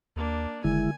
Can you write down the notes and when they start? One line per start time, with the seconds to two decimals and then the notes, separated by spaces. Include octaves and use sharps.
0.16 D#2 A#3 D4
0.64 F#1 D3 D#3 G#3 E4 G#5